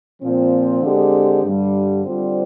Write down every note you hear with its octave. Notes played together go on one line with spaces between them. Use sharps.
A#2 F3 C4
D3 G#3 C4 G4
G2 D3 G3
D3 G3 C4 F4 C5